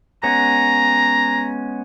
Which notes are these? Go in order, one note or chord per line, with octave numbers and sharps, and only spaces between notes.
G#3 B3 C#4 A#5